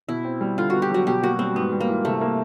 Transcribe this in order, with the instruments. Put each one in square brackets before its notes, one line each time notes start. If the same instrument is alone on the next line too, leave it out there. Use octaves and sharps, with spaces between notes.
[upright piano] B2 [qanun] E4
[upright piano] C4
G3
[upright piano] D3 [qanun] F4
[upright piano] B3 [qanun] F#4
[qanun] G4
[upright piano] F#3 [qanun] F#4
[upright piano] B2 [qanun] G4
[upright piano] A#3 [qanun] F#4
[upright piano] G3 [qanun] C4
[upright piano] G#2 [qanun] B3
[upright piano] G3
[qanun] A#3
[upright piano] E3
[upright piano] C3 [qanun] A3
[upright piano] A#3